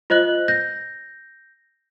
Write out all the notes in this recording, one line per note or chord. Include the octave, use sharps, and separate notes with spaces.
F4 C5 D#5 F#6 F#7
G6 A#6